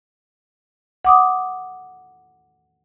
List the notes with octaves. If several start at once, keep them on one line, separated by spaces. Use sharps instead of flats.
F#5 D6 D#6